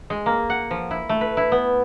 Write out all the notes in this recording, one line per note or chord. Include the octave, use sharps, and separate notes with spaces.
G#3
A#3
F#5
F3
E4
A3
B4
E4
B3